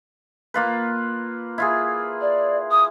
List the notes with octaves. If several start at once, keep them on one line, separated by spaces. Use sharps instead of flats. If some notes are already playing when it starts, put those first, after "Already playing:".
A#3 F4 B4
E4 F4 G#4
D5
D#6